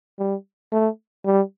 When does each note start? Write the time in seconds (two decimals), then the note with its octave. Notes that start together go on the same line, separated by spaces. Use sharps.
0.19 G3
0.72 A3
1.25 G3